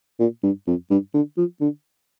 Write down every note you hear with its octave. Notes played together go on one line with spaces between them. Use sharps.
A#2
G2
F2
G2
D3
F3
D3